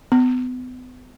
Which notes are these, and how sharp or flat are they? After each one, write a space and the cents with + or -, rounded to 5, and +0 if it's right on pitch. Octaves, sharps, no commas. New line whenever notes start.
B3 +35